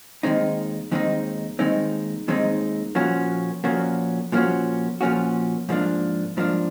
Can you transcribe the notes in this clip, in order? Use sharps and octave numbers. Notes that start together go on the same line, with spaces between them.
D#2 D#3 G#3 C4 D#4
D#2 D#3 G#3 C4 D#4
D#2 D#3 G#3 C4 D#4
D#2 D#3 G#3 C4 D#4
A#2 F3 A#3 C#4 F#4
A#2 F3 A#3 C#4 F#4
A#2 F3 A#3 C#4 F#4
A#2 F3 A#3 C#4 F#4
G#2 F3 A#3 D4
G#2 F3 A#3 D4